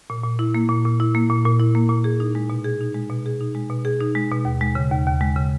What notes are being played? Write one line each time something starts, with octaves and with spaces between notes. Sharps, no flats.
A#2
A#2
E4
A#3
A#2
A#2
E4
A#3
A#2
A#2
E4
A#3
A#2
G#4
D#4
G#3
B2
G#4
D#4
G#3
B2
G#4
D#4
G#3
B2
G#4
D#4
G#3
B2
D#2
G#3
C#3
D#2
D#2
G#3
C#3